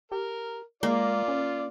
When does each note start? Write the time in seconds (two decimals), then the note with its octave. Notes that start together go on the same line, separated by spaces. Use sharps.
0.12 G4 A#4
0.83 G#3 A#3 F4 D5
1.28 C#4